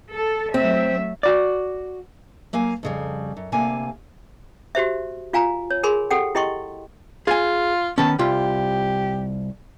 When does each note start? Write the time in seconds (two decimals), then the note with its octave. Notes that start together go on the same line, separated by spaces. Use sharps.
0.12 A4
0.54 F#3 A3 C4 E5
1.23 F#4 D5
2.53 F#3 A#3 F5 G#5
2.83 F2 C#3 G3
3.37 F#2
3.52 D2 C3 A#3 F5 G#5
4.75 F#4 G4 C5 E5
5.33 F4 F5 G#5 A#5
5.70 C#5
5.83 G#4 A#4 G#5 B5 C6
6.11 G4 A4 F#5 G5
6.35 E4 G4 D#5 G5 C6 C#6
7.27 F4 G#4 G#5
7.98 D#3 B3 C#4 A5
8.19 C2 F4 G4